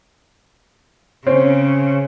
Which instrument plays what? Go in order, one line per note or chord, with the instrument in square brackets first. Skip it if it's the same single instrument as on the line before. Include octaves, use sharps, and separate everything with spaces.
[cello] C#3 [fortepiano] C4 C#4